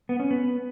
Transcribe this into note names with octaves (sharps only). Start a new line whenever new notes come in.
B3
C#4
B3